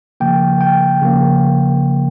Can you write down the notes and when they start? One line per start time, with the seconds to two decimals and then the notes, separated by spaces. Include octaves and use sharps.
0.20 C#3 F3 A#3 G5
0.61 G5
1.01 C#3 F3 A#3